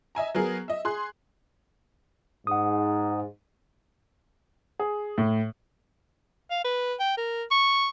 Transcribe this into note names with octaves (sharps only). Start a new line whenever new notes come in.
D#5 E5 G#5 A#5
F#3 B3 G#4 A#4
D#5 E5
G#4 C6 F#6
G#2 F#5 D#6
G#4
A2
F5
B4
G5
A#4
C#6